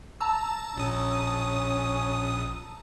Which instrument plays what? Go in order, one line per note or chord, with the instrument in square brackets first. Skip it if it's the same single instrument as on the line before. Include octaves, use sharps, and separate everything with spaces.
[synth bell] A5 A#5 E6
[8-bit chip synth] A#1 D#6 [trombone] C#4